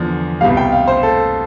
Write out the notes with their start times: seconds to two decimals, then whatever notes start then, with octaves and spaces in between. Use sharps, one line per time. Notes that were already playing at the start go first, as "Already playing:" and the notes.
Already playing: E2 D3 F3
0.41 C2 B2 G3 F5
0.57 G5
0.72 F5
0.87 C5
1.03 A4